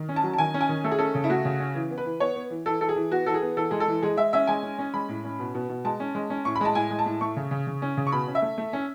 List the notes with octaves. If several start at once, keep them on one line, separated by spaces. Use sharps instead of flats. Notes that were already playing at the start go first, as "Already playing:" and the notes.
Already playing: D#3
C#4
A5
F#3
A5
D#3 G#5
C#4
G#5
D#3
A3 A4
G#4
C#4 A4
C#3
E4
A3 F#4
C#3
C#4
E3
B3
B4
E3
B3 C#5
B3
E3
E3 A4
E3 A4
G#4
E3
B3 F#4
E3 A4
G#4
B3
E3 A4
G#3 G#4
A4
E3
G#3 G#4
G#3 E5
C#4 E5
G#3 G#5
C#4
C#4
G#3 B5
A2
C#4
B2
B2
B2
G#3 A5
C#4
G#3
C#4
A2 C#6
B5
G#3 A5
A2 G#5
G#3
A5
A2
A3 C#6
C#3
C#3
C#3
C#4
C#3
C#6
B2 B5
C#4
E5
A3
A3
C#4